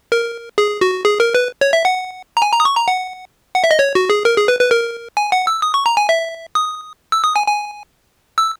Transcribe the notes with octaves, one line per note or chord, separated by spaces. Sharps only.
A#4
G#4
F#4
G#4
A#4
B4
C#5
E5
F#5
A#5
G#5
A#5
D#6
C#6
A#5
F#5
F#5
E5
D#5
C#5
F#4
G#4
A#4
G#4
B4
B4
A#4
G#5
F#5
E6
D#6
C#6
A#5
G#5
E5
D#6
E6
D#6
G#5
G#5
E6